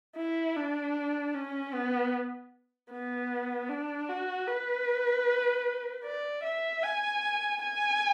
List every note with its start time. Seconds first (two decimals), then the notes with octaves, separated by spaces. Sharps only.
0.16 E4
0.56 D4
1.34 C#4
1.74 B3
2.91 B3
3.69 D4
4.09 F#4
4.48 B4
6.04 D5
6.43 E5
6.83 G#5
7.62 G#5